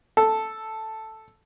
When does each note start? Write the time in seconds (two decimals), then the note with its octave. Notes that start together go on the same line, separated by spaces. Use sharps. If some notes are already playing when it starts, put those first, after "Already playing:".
0.17 A4